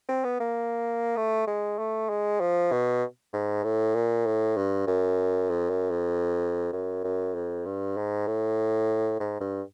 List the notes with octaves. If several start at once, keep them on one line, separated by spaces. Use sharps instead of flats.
C4
B3
A#3
A3
G#3
A3
G#3
F3
B2
G#2
A2
A#2
A2
G2
F#2
F2
F#2
F2
F#2
F#2
F2
G2
G#2
A2
G#2
G2